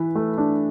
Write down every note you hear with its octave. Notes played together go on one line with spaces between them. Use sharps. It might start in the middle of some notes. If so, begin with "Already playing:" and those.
Already playing: E3 B4
A3
D4